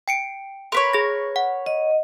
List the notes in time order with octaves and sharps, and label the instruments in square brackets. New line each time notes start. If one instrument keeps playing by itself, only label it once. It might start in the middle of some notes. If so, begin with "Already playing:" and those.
[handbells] G5 C#7 D7
[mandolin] A#4 B4 C#5 [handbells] C6
[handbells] G#4 A#6
F#5
[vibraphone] D#5